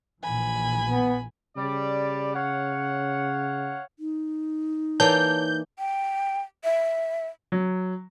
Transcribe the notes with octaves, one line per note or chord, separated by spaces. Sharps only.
A#1 A#2 E3 G#5 B5
B3
C#3 G3 D5
C#5 F5 F#5
D#4
E3 A#3 C#5 D5 A5 G6
G5
E5
F#3